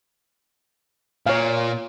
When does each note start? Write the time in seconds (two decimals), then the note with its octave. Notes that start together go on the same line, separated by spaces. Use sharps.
1.26 A#2 C#5 F5